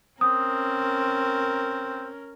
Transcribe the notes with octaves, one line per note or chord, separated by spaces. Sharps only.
C4 C#4 A#4 D#6